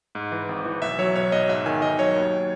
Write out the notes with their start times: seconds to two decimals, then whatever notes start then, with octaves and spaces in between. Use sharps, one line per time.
0.15 G#2
0.32 E3
0.49 G#1
0.65 E3
0.82 B1 E5
0.99 F#3 C#5
1.16 B1 C#5
1.32 B1 D#5
1.49 G#2 E5
1.66 D#3 G#5
1.82 D#3 D#5
1.99 F#3 C#5
2.16 D#2